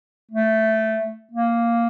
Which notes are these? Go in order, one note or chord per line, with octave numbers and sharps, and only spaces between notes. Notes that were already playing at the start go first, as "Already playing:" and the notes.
A3
A#3